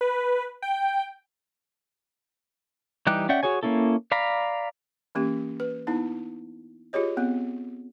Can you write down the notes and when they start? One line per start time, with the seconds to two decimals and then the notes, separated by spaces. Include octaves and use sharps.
0.01 B4
0.62 G5
3.07 E3 G3 D#4 G4 F#6
3.29 C#4 D5 E5 F#5 G5
3.43 F#4 G#4 C#5 G#5
3.63 A#3 C4 C#4 E4 A4
4.12 D5 F5 A#5 B5
5.15 E3 A#3 C#4 G4
5.60 B4
5.87 B3 D#4 E4 A5
6.93 F4 G4 G#4 C#5 D#5
7.17 B3 C4